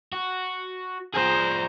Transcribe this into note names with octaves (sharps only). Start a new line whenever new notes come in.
F#4
F3 G#4 C5 A#5